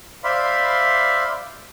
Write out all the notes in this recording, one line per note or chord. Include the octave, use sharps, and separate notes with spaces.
C5 D5 E5 F5 B5 C6